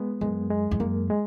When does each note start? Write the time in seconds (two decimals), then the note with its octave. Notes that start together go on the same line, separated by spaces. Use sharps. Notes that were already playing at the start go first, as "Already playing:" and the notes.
Already playing: G#3 B3
0.21 F#2 G#3
0.50 G#3
0.71 F2
0.80 F#2 A#3
1.10 G#3